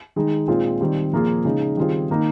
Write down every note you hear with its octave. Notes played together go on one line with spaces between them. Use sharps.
D#3 G#3 D#4
A#2 G#3 C4 F4
D#3 G3 C4
A#2 F3 A#3 F4 G#4
C#3 G#3 D#4
D#3 G3 C4 F4 G#4
D#3 A#3 D#4